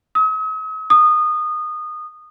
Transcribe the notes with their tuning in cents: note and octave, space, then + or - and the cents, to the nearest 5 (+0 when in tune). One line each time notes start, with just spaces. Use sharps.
D#6 +45
D#6 -20